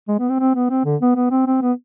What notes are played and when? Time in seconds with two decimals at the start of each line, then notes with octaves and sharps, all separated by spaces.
0.08 G#3
0.19 B3
0.29 C4
0.40 C4
0.55 B3
0.70 C4
0.85 D3
1.01 B3
1.16 B3
1.31 C4
1.47 C4
1.62 B3